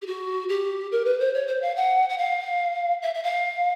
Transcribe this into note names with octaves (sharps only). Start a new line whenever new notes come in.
G4
F#4
G4
A#4
B4
C5
C#5
C5
F5
F#5
F#5
F5
E5
E5
F5